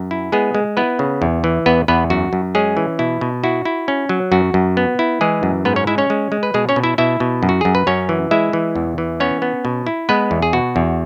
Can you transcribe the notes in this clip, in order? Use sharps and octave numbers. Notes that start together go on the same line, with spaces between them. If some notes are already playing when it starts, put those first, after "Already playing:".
Already playing: F#2
E4
G#3 B3 G#4
G#3
B3 E4 B4
C#3
E2
E3
E2 B3 B4
E2 B3 B4
F#2 F#4
F#2
G#3 C#4 G#4
E3
B2 E4
B2
E4 F#4
E4
C#4
F#3
F#2 F#4
F#2
B3
E4
E3 G#3 G#4
F#2
G#2 B3 B4
C#4 C#5
G#3 E4 E5
C#4 C#5
G#3
G#3
B4
B2 G#3 G#4
C#4 C#5
B2
E4 E5
B2 E4 E5
B2
F#2
F#4
F#2 G#4
B4
F#2 C#4 C#5
E3
G#3 E4 E5
E3
E2
E3
B3 C#4 C#5
B3
B2
E4
G#3 B3 B4
E2
G#4
B2 F#4
E2